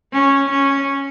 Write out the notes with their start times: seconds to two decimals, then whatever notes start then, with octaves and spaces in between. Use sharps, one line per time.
0.13 C#4
0.50 C#4